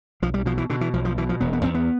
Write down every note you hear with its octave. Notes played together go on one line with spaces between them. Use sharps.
B1 F3
G3
B2 F3
E3
B2 D3
E3
B1 F3
F3
B2 E3
F3
E1 B3
B3
E2 C4
B3